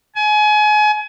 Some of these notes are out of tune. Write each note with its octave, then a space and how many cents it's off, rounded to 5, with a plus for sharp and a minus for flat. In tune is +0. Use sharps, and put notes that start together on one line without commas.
G#5 +30